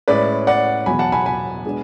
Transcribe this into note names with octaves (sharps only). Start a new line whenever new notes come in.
A2 G#3 C#4 B4 D5
D5 F#5
E2 B2 F#3 G#5 B5
F#5 A5
G#5 B5
G#5 B5
B2 G#3 B3 D4